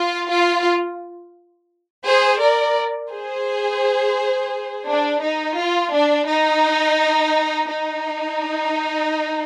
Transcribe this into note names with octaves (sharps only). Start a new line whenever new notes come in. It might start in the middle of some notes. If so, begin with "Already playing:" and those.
Already playing: F4
F4
G#4 C5
A#4 D5
G#4 C5
D4
D#4
F4
D4
D#4
D#4